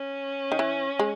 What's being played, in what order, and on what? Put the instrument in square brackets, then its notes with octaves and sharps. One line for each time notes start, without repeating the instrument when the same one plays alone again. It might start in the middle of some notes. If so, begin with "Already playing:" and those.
Already playing: [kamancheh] C#4
[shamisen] D#3
E3
G#3